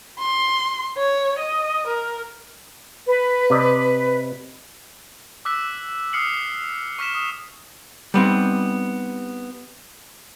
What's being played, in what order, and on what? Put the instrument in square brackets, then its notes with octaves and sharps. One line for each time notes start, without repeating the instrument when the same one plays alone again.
[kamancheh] C6
C#5
D#5
A#4
[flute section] B4
[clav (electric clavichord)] C3 D5 D#5
[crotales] D6 E6 F#6 B6
D#6 F6 C7 C#7 F#7
C#6 F6 B6 E7
D#6
[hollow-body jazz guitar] G3 B3 C4 D#4